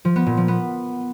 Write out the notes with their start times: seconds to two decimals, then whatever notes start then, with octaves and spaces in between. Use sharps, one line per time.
0.05 F3
0.16 B3
0.26 A#2
0.37 F3
0.48 B3